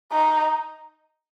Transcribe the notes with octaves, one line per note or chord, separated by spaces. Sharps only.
D#4